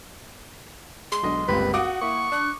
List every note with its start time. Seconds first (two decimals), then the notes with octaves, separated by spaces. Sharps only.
1.12 G#3 C6
1.23 B1 B2 D3 G#3 D#5
1.48 G1 C#2 A#3 C4 G4 B4
1.73 F#4 F5 F#5 D6 D#6
2.01 A#3 E4 C#6
2.32 D4 F#6